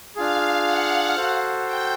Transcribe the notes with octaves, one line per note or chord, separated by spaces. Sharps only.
D4 F4 G#4 F5
F#5
F#4 A4 C5
G5